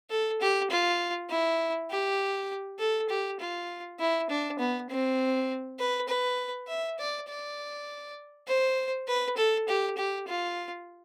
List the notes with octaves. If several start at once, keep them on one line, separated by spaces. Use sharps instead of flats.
A4
G4
F4
E4
G4
A4
G4
F4
E4
D4
B3
C4
B4
B4
E5
D5
D5
C5
B4
A4
G4
G4
F4